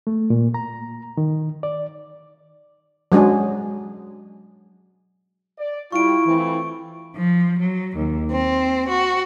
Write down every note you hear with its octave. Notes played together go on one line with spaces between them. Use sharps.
A3
A#2
A#5
D#3
D5
F#3 G#3 D4 G#4
D5
G3 E4 F4 C#6 D7
E3 A3 C4 F4
F3
F#3
D#2
C4
F#4